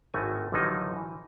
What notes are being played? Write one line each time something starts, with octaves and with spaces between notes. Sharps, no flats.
G#1 A2 A3 F#4 G#5
A1 D3 D#3 F3 F#3 D#4
E3